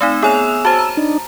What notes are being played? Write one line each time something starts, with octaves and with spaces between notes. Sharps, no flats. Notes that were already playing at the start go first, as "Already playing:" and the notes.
A3 C4 D#4 E6
B3 G#4 C#5 F7
F#4 C5 A5
A#5
D4 D#4